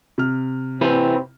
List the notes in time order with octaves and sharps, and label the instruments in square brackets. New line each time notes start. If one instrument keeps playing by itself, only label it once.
[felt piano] C3 F6
[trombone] C4 [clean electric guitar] E4 G4 B4